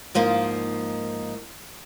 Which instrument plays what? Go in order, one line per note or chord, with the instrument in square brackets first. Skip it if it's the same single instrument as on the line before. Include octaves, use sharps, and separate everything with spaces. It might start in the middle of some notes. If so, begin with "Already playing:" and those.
[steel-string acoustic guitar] G#2 F3 A#3 D#4